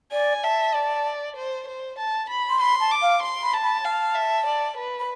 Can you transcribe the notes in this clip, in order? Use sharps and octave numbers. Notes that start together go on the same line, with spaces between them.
D5 G#5
E5 A5
D5
C5
C5
A5
B5
C6
B5 C6
A5
D6
F5
C6
B5
A5
B5
F5 A5
E5
D5
B4
B5